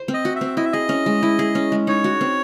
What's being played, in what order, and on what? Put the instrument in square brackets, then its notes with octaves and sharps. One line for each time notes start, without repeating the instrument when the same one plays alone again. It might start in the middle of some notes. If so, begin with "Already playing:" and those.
Already playing: [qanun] C5
C4
[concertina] D#5
[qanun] F#4
[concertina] E5
[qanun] C4
[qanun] E4 [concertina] D#5
[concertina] E5
[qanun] G#4 [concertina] D#5
[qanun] C#4
G#3
E4
G#4
C#4
G#3
[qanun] D#4 [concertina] C#5
[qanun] F#4
C4